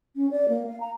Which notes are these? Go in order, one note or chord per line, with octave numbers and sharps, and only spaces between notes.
C#4
D5
A#3
F5
A#5